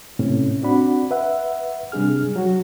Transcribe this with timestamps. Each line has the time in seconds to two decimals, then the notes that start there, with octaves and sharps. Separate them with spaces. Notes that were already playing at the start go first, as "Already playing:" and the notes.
0.19 A2 C3 C#4
0.62 C4 D4 F#4 D5 F#5 B5
1.11 B4 E5 F#5
1.92 C3 G3 D4 G#4 F6
2.36 F#3 F#4